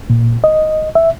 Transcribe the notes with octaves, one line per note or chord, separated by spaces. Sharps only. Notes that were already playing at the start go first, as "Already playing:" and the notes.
A#2
D#5
E5